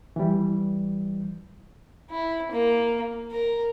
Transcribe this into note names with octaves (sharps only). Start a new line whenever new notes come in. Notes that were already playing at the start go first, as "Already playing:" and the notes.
E3 G3
E4
A#3
A#4